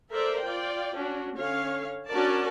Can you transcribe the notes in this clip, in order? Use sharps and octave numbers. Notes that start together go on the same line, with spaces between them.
A4 A#4 C5 D5 E5
F4 D5 G5
C#4 D4 F#4
D3 C#4 C#5 F5
C#4 D4 F#4 A#4 D5 A5